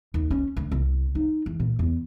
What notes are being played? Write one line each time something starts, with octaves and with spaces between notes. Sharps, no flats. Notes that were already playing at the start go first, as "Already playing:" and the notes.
D#2
C#4
D2
C2
D#4
E2
A#2
E2